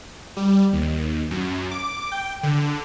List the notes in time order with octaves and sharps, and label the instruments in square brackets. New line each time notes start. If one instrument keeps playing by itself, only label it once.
[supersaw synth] G3
D#2
F#2
D6
G5
D3